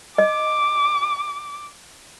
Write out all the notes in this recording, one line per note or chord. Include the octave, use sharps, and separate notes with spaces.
D#5 D6